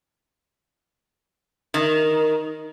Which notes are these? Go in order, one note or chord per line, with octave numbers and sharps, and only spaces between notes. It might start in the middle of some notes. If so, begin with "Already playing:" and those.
D#3